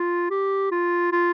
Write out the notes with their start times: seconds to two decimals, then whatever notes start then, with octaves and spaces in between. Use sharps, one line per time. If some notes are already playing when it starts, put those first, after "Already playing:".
Already playing: F4
0.30 G4
0.71 F4
1.12 F4